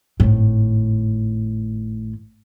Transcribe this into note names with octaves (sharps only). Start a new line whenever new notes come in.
G#1 A2